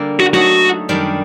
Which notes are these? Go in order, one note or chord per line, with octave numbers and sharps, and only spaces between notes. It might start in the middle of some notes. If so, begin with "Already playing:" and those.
Already playing: D3 G3 A#3
F#4
F#3 A3 D#4 F#4
F#2 D#3 G3 D4